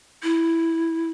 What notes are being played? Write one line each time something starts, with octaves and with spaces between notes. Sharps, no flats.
E4